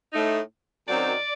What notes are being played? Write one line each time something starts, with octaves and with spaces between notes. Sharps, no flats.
A2 A3 D#4
F#2 D#3 F#3 C4 D#4 D5